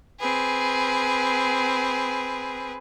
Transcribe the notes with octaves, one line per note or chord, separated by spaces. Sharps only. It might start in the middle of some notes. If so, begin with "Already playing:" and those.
C4 G#4 B4